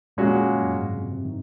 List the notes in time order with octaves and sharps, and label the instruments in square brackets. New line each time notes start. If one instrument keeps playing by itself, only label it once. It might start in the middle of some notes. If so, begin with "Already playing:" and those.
[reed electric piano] F2 [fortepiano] A#2 G#3 C#4 F#4
[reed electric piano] F#2
G#2
C3
C3
D#3